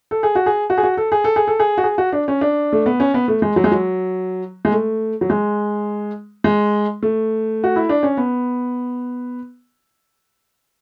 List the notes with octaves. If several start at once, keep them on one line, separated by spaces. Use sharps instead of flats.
A4
G#4
F#4
G#4
F#4
G#4
F#4
A4
G#4
A4
G#4
A4
G#4
F#4
G#4
F#4
D4
C#4
D4
A3
B3
C#4
B3
A3
G#3
F#3
G#3
F#3
G#3
A3
F#3
G#3
G#3
A3
F#4
E4
D4
C#4
B3